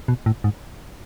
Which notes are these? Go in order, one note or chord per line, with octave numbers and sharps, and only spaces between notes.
B2
A2
G#2